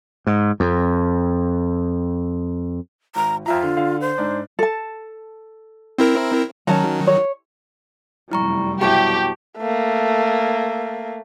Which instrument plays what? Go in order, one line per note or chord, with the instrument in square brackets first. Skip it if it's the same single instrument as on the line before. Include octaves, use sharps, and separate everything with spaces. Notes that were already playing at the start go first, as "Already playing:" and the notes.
[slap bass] G#2
F2
[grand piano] G#1 [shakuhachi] A#5
[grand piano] F2 E5 A#5 [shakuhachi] F4
[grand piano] D3
D3 F5
[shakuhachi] C5
[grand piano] G#2 D4
[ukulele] A4 A5
[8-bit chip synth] C4 E4 A#4
[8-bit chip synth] D#3 F#3 [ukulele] C#4 A5 A#5
[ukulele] C#5
[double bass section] F1 F#2 G3 [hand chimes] E4 A#5 C#6
[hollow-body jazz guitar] B2 F#3 E4 [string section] G4 [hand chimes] G5 A5 C#6
[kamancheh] A3 A#3